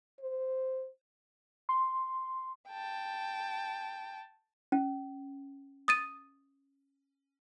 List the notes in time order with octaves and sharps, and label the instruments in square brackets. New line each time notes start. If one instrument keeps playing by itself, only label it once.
[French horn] C5
[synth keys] C6
[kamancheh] G5 A5
[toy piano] C#4
[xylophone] D#6 A6 D#7